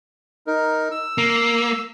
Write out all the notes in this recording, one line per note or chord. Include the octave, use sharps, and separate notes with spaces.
D#4 A#4
E6
A#3